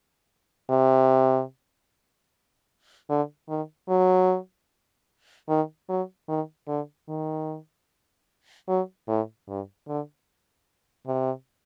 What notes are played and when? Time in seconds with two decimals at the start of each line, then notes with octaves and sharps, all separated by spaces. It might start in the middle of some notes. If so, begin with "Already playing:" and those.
0.70 C3
3.09 D3
3.49 D#3
3.89 F#3
5.49 D#3
5.89 F#3
6.28 D#3
6.68 D3
7.09 D#3
8.68 F#3
9.08 A2
9.48 G2
9.88 D3
11.07 C3